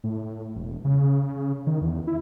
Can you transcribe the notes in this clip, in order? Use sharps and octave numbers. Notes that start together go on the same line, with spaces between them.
A2
E1
C#3
C#3
D#3
E2
E4